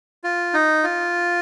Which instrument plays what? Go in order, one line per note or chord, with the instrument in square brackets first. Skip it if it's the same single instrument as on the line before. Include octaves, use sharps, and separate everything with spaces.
[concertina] F4
D#4
F4